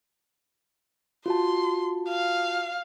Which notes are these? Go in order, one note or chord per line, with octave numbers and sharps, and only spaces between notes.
F4 F#4 A5 C6
F5